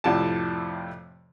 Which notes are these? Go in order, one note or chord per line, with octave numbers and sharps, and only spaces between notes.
F2 A2 C3 D5 A5